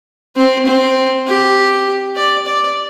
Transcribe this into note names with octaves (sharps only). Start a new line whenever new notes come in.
C4
C4
G4
D5
D5